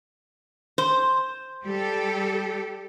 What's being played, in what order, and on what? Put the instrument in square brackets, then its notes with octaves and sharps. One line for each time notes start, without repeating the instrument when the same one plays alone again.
[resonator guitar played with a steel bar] C5
[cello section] G3 G4 A4